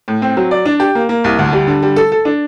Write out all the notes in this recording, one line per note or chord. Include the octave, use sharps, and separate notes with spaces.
A2
C4
F#3
D5
D4
G4
A#3
A#3
C2
D2
G3
D3
G3
A4
A4
D4